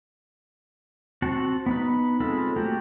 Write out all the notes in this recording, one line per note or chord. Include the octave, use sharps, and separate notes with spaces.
C4 F#4 F#5 A5
B3 D#4 B4
G#3 C4 F4 A4 B5
A3 A#3 F#4 G4